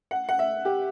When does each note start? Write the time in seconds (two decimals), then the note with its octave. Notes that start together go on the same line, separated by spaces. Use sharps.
0.11 F#5
0.29 F#5
0.39 E5
0.65 G4